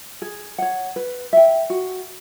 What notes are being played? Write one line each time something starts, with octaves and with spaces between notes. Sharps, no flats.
G#4
C#5 F#5
B4
E5 G5
F#4